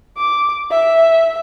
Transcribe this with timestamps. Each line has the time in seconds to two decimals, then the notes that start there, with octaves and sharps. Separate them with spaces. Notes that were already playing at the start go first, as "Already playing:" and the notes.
0.18 D6
0.71 E5